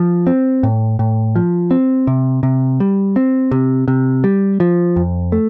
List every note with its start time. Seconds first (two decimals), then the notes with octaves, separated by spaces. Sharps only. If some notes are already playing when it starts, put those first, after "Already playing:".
Already playing: F3
0.27 C4
0.63 A2
0.99 A2
1.36 F3
1.71 C4
2.07 C3
2.43 C3
2.80 G3
3.16 C4
3.51 C3
3.88 C3
4.24 G3
4.60 F3
4.96 F2
5.32 A3